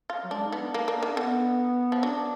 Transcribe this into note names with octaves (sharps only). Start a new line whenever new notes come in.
F4
F#3
G#3 D4
D#4
B3
D4
A#3
A#3
D#3
D3 B3
F3
F#3 D4